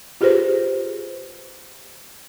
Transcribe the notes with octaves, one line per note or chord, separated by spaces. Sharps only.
F4 G4 G#4 B4 C5